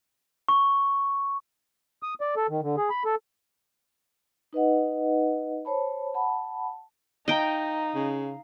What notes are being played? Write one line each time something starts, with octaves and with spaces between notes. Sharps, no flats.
C#6
D#6
D5
A4
D#3
D3
G#4
B5
A4
D#4 B4 D#5 F#5
C5 C#5 A5 B5
F#5 A5 B5
D#4 D#5 F5 G5 A#5
C#3